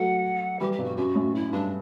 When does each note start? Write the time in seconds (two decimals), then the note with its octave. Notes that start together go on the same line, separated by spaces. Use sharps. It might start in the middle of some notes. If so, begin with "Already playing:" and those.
Already playing: F#3 A3 F#5
0.60 E3 G3 G4
0.72 G4
0.79 G2 B2
0.84 F#4
0.97 F#2 F#4
1.15 F#2 A2
1.35 E4
1.52 G2 D4